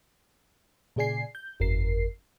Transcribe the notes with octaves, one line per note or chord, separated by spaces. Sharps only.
A#2 C#3 G#4 D5 G#5 C7
G6
G1 F2 A#4 C7